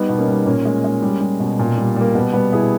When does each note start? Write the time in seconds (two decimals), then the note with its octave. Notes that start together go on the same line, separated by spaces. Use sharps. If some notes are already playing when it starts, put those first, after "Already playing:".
Already playing: G3 B3 D#4
0.09 B2
0.18 A#3 C#4
0.28 G3
0.46 A#2 A#3 C#4
0.65 G#3
0.84 G#3
1.02 G3
1.21 G3
1.40 B2
1.59 A#2
1.78 G3
1.96 G3 A#3
2.15 B2 B3
2.33 G3 B3
2.52 B2 E4 G#4